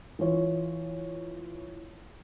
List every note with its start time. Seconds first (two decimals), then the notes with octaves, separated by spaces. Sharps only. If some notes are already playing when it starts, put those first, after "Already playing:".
0.19 E3 F4 C#5